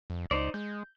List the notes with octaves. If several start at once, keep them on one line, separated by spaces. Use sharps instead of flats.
F2
C#2 D#4 C5 D5
G#3 G6